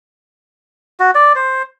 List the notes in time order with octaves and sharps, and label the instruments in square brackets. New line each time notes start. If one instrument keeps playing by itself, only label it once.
[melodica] F#4
D5
C5